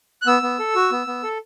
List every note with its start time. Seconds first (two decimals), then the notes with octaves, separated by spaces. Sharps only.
0.22 F#6
0.26 B3 E6
0.42 B3
0.59 A4
0.75 F#4
0.92 B3
1.07 B3
1.23 A4